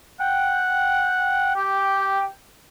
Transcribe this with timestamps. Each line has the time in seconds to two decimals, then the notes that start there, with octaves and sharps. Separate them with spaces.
0.20 F#5 G5
1.56 G4